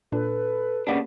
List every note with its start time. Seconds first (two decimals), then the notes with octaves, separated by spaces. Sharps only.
0.12 A#2 D4 A4 B4
0.87 C#3 A#3 B3 D4 G4 D5